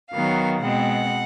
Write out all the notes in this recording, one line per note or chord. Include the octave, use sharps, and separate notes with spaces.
D#3 F#3 B3 F5
B2 G#3 C4 F#5